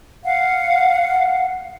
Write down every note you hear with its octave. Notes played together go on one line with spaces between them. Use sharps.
F5 F#5